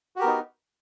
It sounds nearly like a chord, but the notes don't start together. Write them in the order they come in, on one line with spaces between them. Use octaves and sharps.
F#4 G4 A#4 B3 D#4